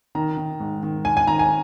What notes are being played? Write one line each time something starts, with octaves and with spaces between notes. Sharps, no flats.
D#3 A#5
D#3
G#2
D#3
D#3 G#5
G#5
D#3 A#5
G#5